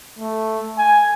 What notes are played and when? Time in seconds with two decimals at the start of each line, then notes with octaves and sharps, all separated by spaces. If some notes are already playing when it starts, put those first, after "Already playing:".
0.19 A3
0.78 G#5